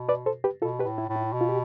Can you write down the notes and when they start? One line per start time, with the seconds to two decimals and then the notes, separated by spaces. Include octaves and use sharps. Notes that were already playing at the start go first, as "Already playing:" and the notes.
Already playing: B2
0.09 B4 D5
0.26 A4 C5
0.44 G4 B4
0.62 B2 F4 A4
0.79 G4 B4
0.86 A2
0.98 E4
1.09 A2
1.16 E4
1.33 B2
1.41 F4
1.49 G4